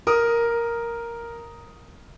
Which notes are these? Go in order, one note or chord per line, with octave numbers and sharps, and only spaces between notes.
A#4 D#6